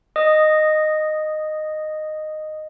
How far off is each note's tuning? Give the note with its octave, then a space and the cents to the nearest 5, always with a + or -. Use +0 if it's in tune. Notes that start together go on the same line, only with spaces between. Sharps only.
D#5 -10 D#6 +0